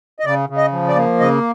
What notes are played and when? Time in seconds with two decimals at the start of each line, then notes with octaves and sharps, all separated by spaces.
0.20 D#5
0.25 C#3 D5
0.49 C#3
0.57 D#5
0.72 F3
0.88 D5
0.96 A#3
1.20 C#3 D#5